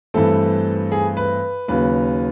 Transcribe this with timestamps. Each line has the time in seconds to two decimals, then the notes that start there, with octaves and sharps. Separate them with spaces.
0.14 G2 E3 A3 C4 A4
0.92 G#4
1.17 B4
1.68 D#2 C#3 F#3 B4